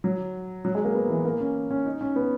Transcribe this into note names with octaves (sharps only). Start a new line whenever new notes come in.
F#3
F#3
G#3
A#3
B3
E3
A#3
C#4
C#4
D#4
C#4
B3